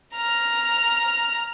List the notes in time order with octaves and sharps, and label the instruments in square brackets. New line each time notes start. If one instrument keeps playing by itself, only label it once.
[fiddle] A#5 F6